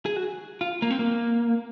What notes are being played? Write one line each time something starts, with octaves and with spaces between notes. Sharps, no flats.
G#4
F#4
F4
A#3
C4
A#3